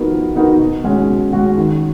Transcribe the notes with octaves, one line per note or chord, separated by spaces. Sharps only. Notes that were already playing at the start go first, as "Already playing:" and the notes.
Already playing: F3 B3 D#4 F#4 A#4
F3
B3 D#4 F#4 A#4
B2
G#3 C#4 F#4
B2
G#3 C#4 F#4
D#3